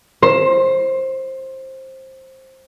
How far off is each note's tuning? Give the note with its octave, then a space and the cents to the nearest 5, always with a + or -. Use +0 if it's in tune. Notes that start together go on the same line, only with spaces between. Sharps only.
C5 +15